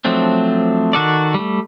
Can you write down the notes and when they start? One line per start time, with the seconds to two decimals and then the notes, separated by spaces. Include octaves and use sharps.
0.05 F3 F#3 A3 C4 D4
0.93 D#3 F#4 A4 D5
1.34 G3 A3